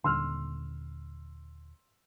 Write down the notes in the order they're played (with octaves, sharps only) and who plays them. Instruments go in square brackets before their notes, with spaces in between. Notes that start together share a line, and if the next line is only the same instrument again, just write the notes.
[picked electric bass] D#1 D3 [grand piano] C6 E6 F6